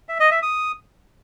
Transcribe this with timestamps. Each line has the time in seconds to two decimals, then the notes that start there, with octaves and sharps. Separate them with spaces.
0.09 E5
0.20 D#5
0.31 E5
0.42 D#6